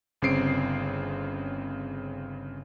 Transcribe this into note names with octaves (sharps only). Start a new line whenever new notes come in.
G1 C#3 C4 C7 D7